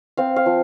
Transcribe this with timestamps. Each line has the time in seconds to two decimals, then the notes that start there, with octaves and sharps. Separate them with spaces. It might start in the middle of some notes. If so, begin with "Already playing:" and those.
0.17 C4 F5
0.36 F5
0.46 F3